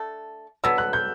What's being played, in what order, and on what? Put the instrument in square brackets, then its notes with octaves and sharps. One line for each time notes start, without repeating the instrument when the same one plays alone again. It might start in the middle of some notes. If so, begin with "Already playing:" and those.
Already playing: [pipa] A3 D4 A4
[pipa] F#3 B3 D4 [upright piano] E6
[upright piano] F#6
G6